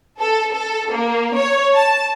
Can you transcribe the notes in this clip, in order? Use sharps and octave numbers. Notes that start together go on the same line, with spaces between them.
A4
A4
A#3
C#5
A5